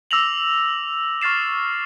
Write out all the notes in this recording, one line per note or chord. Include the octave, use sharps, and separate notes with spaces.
D6 E6 A#6 F7 F#7
C#6 F6 A6 C7 E7